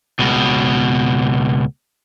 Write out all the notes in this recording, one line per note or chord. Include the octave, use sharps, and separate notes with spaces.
C#2 B2